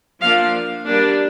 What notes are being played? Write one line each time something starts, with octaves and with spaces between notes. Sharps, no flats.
F3 A#3 D4 F5
G3 A#3 D4